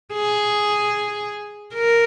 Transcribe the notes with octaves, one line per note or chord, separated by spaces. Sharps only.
G#4
A#4